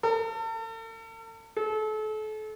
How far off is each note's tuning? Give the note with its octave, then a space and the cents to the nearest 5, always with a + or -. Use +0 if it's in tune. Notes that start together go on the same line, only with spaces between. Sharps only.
A4 +40
A4 -35